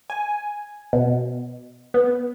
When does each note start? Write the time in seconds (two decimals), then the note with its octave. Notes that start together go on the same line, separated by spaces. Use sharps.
0.10 G#5
0.93 B2
1.94 B3